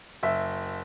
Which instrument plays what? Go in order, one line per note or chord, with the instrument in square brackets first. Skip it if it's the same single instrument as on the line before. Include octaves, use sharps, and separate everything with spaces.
[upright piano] F#1 E5